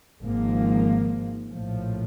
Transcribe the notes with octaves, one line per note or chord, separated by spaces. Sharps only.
G#1 G#2 F3 A#3
A#1 A2 F3